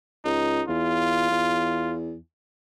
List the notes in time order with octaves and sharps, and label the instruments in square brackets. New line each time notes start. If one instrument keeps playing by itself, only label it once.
[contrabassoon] C#2 [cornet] D#4
[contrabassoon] E2 [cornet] F4
[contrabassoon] E2